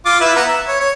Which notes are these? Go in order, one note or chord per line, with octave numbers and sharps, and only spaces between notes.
F4 D6
E4 B4 E5
B3 A#5
E5
C#5
C#5